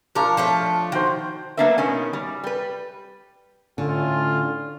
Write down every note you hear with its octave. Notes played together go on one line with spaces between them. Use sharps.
F3 D4 A#4 F5 C#6
F3 A3 C#5
D#3 F#4 C5
F#3 A#3 B3 D4 B4 E5
B2 D#3 C#4
G3
G3 B4
A2 D3 C#4 F4